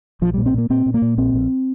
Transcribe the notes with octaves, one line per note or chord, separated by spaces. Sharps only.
A#1 F3
A#2 G3
C4
A#2 A#3
A#2 C4
A#2
A#3
A#2
A#1 C4
A#1